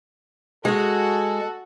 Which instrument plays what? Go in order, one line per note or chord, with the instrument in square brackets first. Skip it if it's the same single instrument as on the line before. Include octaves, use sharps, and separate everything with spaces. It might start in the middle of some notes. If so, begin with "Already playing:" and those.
[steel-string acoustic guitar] G#3 G#4 [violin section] F#4 [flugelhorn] A4